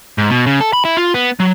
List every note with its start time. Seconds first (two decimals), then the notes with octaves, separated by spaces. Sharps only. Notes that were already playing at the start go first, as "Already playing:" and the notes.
0.18 G#2
0.30 B2
0.46 C#3
0.61 A4
0.73 B5
0.85 E4
0.97 F4
1.14 B3
1.40 F#3